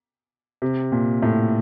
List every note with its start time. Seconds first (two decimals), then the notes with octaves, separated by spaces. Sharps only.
0.62 C3
0.92 A#2
1.22 A2